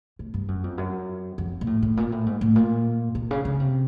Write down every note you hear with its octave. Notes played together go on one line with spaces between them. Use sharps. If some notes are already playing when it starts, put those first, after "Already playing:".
A2
G2
F#2
F2
F#2
F2
A#2
A2
A2
A#2
A2
G#2
A2
A#2
A#2
C#3
C#3
C3